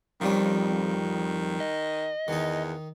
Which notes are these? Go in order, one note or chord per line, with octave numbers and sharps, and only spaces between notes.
F2 D#3 F3 G3 C#4
D#5
E2 D#3 D#4